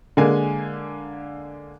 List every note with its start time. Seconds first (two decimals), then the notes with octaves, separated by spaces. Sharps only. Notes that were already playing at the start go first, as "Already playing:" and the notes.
0.17 D3 G#3 A#3 G#5